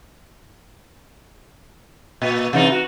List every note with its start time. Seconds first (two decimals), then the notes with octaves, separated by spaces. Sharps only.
2.22 A#2
2.53 C3 E3 D#4
2.72 F#4